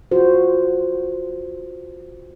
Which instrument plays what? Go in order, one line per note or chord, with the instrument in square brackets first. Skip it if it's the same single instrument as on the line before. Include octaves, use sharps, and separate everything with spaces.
[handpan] F4 F#4 C5